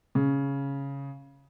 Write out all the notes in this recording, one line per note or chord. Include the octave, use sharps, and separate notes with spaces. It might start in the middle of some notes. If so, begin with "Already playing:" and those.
C#3